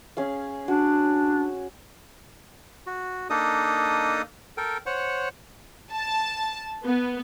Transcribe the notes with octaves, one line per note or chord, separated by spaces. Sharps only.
C#4 G#4 F5
D4 F#4
F#4
A#3 D4 D#4 A4 D#5 D#6
A4 A#4 G5
C5 C#5 F#5
A5
B3